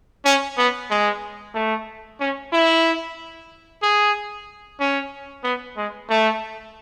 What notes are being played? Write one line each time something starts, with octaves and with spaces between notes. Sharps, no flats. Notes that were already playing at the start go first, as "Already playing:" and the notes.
C#4
B3
G#3
A3
C#4
E4
G#4
C#4
B3
G#3
A3